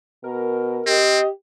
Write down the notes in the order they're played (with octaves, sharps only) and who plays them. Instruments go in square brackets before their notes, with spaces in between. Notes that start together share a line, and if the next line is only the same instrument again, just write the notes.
[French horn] B2 [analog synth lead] A#4
[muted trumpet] C4 [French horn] G4 [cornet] D#5